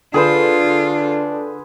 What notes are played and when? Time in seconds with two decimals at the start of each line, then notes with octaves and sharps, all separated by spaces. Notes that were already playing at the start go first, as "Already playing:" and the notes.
0.14 D3 D4 F4 G#4 B4 C5